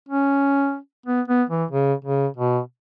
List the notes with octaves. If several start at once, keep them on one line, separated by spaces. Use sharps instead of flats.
C#4
B3
B3
E3
C#3
C#3
B2